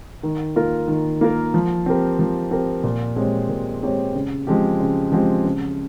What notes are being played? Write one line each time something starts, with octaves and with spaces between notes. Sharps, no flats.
D#3
A#3 F4 A#4
D#3
A#3 F4 A#4
F3
C4 G4 A#4
F3
C4 G4 A#4
A#2
G#3 C4 G4 C#5
A#2
G#3 C4 G4 C#5
C#3
F3 G#3 C4 G4
C#3
F3 G#3 C4 G4
C#3